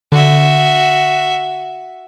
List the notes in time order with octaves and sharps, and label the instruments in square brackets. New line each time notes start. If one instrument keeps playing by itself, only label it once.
[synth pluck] D3 [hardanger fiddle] F#4 E5